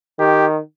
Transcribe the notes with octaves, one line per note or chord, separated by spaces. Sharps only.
D#3 G4